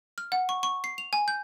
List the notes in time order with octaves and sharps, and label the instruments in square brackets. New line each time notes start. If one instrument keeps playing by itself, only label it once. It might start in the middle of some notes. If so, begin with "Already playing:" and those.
[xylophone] F6
F#5
C#6
C#6
C7
F7
G#5
G6